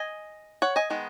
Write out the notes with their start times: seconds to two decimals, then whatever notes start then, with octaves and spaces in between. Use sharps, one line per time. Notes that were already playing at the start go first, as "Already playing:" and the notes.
Already playing: D#5 G#5
0.62 C#5 F#5
0.76 D#5 G#5
0.90 D#3 G#3 B3